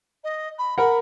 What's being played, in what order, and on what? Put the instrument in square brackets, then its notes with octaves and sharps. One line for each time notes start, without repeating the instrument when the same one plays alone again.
[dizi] D#5
B5
[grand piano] A#4 F#5 [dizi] B5